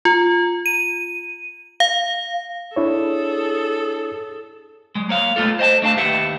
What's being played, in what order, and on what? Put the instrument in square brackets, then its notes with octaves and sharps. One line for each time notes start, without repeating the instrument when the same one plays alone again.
[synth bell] F4
D#7
F5
[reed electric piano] D4 E4 C#5 [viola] G#4 A4
[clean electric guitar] F#3 G#3
A#3 C#5 F5
G#3 A3 B3 F4 A4
C5 D#5 G5 A5
A3 D4 F5 A5
D#2 D#3 G4 B4 E5 F#5